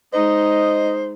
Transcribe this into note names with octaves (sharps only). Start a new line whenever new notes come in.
G#3 D#4 C5 D#5